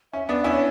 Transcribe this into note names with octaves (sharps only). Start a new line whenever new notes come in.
C#4 E5
B3 D4 E5
C#4 E4 C#5